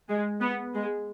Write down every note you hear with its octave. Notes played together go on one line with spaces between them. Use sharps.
G#3
B3
G#3